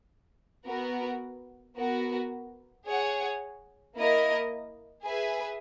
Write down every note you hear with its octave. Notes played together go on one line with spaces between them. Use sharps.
B3 F#4 A#4
B3 F#4 A#4
G#4 C#5 F#5
A#3 E4 A#4 D#5
G#4 B4 E5 G#5